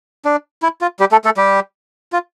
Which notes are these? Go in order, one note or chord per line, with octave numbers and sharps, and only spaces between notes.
D4
E4
F4
G3 G4
A3 A4
A3 A4
G3 G4
F4